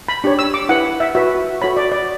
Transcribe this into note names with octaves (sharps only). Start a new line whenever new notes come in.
B5
D4 G4 C#5
E6
D6
E4 B4 F#5
E5
F#4 B4 E5
F#4 A4 C#5 B5
D5
D5